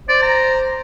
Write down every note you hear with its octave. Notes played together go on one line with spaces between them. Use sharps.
C5 D5
A#5